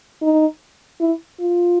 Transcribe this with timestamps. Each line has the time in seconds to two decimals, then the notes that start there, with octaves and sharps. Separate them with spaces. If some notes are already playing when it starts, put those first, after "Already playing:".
0.22 D#4
1.01 E4
1.39 F4